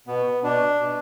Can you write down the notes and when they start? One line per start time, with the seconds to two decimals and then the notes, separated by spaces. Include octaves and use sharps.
0.07 B2 B3
0.43 B2 D4
0.80 B2